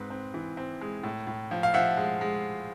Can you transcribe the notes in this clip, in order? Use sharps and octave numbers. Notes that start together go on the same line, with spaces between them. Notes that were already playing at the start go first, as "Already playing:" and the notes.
Already playing: G#2 C4 B4
C4
E3
C4
G#3
A2
A2
F3
F5
F3 E5 F#5
G#3
G#3